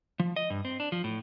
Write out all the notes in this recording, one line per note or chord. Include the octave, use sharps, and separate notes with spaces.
F3
D#5
G2
C4
D4
F3
A2